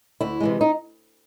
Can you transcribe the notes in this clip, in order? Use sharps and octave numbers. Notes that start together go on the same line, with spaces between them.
D2 E4
C3 E3 G#3
D#4